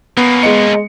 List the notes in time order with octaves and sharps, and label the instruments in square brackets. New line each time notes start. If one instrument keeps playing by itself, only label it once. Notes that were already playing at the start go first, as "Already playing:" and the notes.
[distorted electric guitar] A#3 C#4 [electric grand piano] B3 [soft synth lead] B5
[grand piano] G#3 C#7 [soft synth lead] D#5